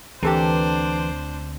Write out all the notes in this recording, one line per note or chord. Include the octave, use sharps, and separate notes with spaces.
D2 E3 C4 D4 G4 A4 A#4 C5